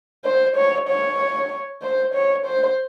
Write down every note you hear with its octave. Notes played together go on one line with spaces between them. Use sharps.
C5
C#5
C#5
C5
C#5
C5